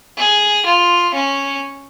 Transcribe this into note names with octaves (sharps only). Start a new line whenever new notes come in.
G#4
F4
C#4